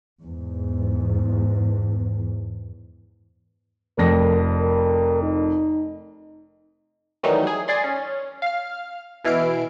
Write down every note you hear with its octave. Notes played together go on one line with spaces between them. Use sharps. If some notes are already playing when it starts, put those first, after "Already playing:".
E2 G#2
F1 F2 A#4 A#6
A#4
D#4
D#3 E3 F#3 G3 A3 D#4
G#4
G#4 D5 C6
C#4
F5 F6
B2 E3 E4 F6 C7 D7